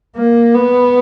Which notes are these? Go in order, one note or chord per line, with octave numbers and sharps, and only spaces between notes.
A#3
B3